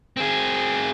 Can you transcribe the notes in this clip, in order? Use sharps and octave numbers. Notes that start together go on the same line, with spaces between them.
C4 G#4